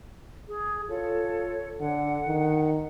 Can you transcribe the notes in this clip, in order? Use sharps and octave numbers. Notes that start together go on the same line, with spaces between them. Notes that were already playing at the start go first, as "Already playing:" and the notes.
G#4
F4 A4 C#5
D3 F#5
D#3